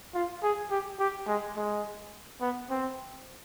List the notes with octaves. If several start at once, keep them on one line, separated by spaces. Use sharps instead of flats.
F4
G#4
G4
G4
G#3
G#3
B3
C4